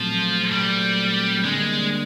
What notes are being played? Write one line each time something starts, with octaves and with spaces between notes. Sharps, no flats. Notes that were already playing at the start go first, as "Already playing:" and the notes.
Already playing: A#2 F3 F#3 A3 C4
G3
D3 G3 G#3 A#3 D4